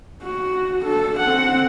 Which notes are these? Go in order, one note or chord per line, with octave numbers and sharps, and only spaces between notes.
F#4
D4 A4
C4 F#5